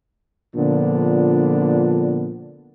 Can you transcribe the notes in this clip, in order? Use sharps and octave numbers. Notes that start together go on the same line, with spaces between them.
A#2 D3 F3 B3 D4